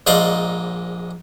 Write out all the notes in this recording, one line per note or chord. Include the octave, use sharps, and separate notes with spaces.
A#1 G#2 D#4 D5 F5 C6